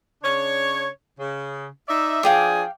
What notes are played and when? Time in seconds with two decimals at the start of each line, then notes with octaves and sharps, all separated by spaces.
0.23 C#3 D4 C#5
1.19 C#3
1.89 D#4 D5 E5
2.23 F3 D4 G#4 F5 G5 D6